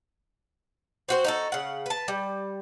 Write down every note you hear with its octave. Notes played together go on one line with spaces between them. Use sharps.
C4 F#4 C5
D#4 F#4 A4
C#3 F#5
B4 A5
G3